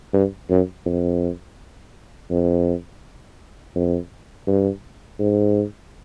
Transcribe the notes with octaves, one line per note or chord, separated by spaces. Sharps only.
G2
F#2
F2
F2
F2
G2
G#2